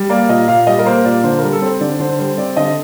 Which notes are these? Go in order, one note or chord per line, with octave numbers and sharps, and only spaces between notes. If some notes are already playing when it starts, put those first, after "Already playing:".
Already playing: G3
A#3 D5
A#2 D#5
A#2 F5
G3 D#5
A#4
A#3 C5
A#2 D5
D3 C5
G3 A#4
A4
C4 C5
D3 D5
D3 C5
G3 C5
C4 D5
D3 D#5